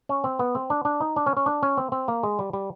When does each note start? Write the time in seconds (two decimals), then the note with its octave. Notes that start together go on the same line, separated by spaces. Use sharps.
0.09 C#4
0.24 C4
0.39 B3
0.55 C4
0.70 D4
0.85 D4
1.01 D#4
1.16 D4
1.26 C#4
1.37 C#4
1.46 D4
1.63 C#4
1.78 C4
1.92 C4
2.08 A#3
2.23 G#3
2.39 G3
2.53 G3